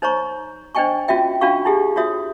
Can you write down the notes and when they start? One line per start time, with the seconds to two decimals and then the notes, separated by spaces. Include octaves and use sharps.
0.02 D#4 C5 C#5 A#5 C#6
0.75 D4 C5 D#5 G5 G#5 C#6
1.08 C#4 F4 F#4 E5 G5
1.41 C#4 D4 F4 F#4 F5 C#6
1.65 D#4 E4 G4 G#4
1.96 F4 F#4 C#5 E5 D#6